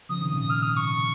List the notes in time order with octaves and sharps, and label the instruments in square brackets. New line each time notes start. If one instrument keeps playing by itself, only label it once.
[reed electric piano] C#3 F3 [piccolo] D#6
[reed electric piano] C3 D#3
A#2 C#3
G#2
[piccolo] F6
D#6
C#6